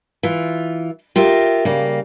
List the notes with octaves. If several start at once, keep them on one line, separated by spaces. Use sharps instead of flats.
E3 F4
F4 G4 A#4 E5
C#3 G3 A#3